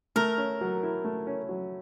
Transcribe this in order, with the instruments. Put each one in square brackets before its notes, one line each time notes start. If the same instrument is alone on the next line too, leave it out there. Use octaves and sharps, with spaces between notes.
[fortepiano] A3 [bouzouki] A#4
[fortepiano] C#4
F#3
E4
A3
C#4
F#3